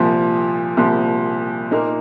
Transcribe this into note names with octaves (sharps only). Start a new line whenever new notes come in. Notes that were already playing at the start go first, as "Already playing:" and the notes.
Already playing: C2 A#2 F3
C2 A#2 F3
A#2 A#3 D#4 A#4